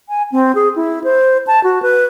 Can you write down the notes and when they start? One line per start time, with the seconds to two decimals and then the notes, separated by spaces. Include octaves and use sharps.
0.09 G#5
0.32 C4
0.55 G#4
0.76 E4
1.04 C5
1.47 A5
1.63 F#4
1.82 B4